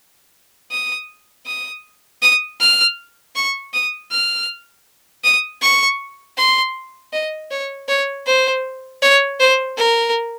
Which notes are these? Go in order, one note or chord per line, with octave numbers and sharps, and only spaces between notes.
D#6
D#6
D#6
F6
C#6
D#6
F6
D#6
C#6
C6
D#5
C#5
C#5
C5
C#5
C5
A#4